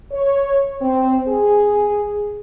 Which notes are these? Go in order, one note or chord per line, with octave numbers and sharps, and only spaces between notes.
C#5
C4
G#4